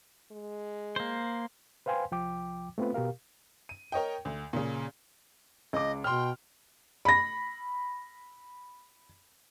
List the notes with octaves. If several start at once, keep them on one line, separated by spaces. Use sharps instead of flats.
G#3
A#3 C5
B4 C5 F5 G5 G#5 C6
C2 F3 G5 D6
A3 B3 C4 F4 B4
B2 G4 A#4 F5
D#7
A#4 C#5 D#5 G5
D2
A#2 C#3
C#2 D#5 D6
B2 G5 C6 F6
B5 A#6